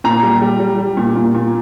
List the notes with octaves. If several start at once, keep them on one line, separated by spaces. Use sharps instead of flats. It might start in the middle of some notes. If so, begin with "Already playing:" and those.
A#2 A#5
G3
G3
G3
G3
A#2
A#2
A#2